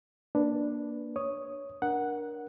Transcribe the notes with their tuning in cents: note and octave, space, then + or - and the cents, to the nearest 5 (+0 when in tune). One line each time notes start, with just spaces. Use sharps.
A#3 +15 D4 +0 B4 +0
C#5 +0 D#6 +0
D4 +0 A#4 +20 F#5 +0